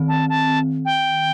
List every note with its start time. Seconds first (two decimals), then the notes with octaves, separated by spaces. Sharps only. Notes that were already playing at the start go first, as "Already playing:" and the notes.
Already playing: D#3 C4
0.08 A5
0.29 A5
0.85 G5